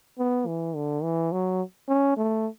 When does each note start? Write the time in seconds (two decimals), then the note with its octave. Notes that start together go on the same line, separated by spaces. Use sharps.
0.19 B3
0.47 E3
0.75 D3
1.03 E3
1.32 F#3
1.89 C#4
2.17 A3